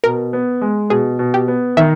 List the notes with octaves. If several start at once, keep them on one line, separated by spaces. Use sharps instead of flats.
B2 A#4
B3
G#3
B2 G#4
B2
G4
B3
D#3 E5